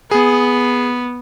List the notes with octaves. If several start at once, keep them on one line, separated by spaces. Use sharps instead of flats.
B3 G#4